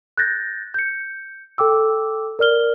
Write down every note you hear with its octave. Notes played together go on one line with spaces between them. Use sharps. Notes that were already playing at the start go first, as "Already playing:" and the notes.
F#6 G6 A6 A#6
G6 C#7
A4 G5 D6 E6
A#4 D5 F6 G7